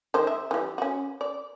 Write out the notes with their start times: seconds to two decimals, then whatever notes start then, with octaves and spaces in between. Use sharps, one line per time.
0.14 D#3 G#3 C5
0.27 E5
0.51 E3 G3
0.78 C#4 F#4
1.21 D5